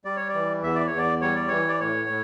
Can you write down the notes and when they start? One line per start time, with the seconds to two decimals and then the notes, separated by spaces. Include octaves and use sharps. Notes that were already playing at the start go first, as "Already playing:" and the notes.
0.05 G3 D5
0.16 C#5
0.28 D5
0.34 E3
0.62 E2 E5
0.75 D5
0.87 C#5
0.92 E2
0.98 D5
1.21 G3 C#5
1.35 D5
1.48 E3 C#5
1.68 D5
1.80 A2 C#5
2.09 A2